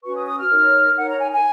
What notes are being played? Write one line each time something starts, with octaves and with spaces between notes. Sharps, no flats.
C#4 F#4 B4 C#6
D#6
D#6
F6
D#4 A#4 C#5
D#4 A#4 C#5 F#5
A#5
G#5
G#5